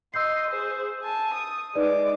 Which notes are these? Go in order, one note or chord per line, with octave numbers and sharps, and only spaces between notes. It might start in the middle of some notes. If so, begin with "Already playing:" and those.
D#5 C6 E6 G6 C7
G#4 C5
G#5 A5
D#6
G#3 D#4 B4 D5 D6